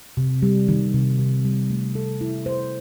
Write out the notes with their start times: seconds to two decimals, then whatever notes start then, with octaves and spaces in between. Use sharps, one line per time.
0.17 C3
0.42 G3
0.68 D#3
0.94 C3
1.19 C3
1.45 G3
1.70 A3
1.95 A4
2.21 E4
2.46 C5